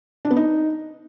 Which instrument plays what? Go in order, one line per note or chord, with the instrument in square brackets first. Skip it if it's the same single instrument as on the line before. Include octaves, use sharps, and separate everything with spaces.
[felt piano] D4
B3
D#4